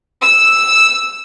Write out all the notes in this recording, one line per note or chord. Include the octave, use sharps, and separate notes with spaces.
E6